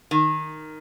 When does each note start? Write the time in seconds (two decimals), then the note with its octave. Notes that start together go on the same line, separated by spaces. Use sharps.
0.11 D#3